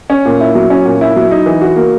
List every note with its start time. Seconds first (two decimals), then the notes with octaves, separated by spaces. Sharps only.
0.10 C#4
0.25 A#2
0.40 E4
0.55 F#3
0.70 C#4
0.85 A#2
1.01 E4
1.16 F#3
1.31 D#4
1.46 E3
1.61 F#4
1.76 A#3